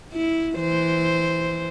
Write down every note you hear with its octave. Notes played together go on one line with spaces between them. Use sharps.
E4
E3 C5